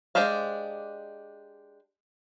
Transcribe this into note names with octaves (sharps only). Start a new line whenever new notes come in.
G#3 D4 G4 C5 F5